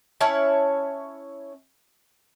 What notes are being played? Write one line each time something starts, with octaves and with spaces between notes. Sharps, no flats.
C#4 E4 C#5 A5